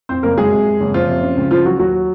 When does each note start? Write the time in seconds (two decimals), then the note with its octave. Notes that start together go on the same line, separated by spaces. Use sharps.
0.09 F2 C4 C5
0.23 F#1 A#3 A#4
0.37 F#3 G#3 G#4
0.51 C3
0.66 F2
0.80 F#1
0.94 F#1 F3 F4
1.08 C3
1.22 C#3
1.37 C#2
1.51 C#2 F3 F4
1.65 F#3 F#4
1.79 D#2 F#3 F#4